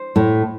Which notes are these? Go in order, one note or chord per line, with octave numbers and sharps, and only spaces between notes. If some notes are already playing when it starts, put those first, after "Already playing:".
Already playing: C5
A2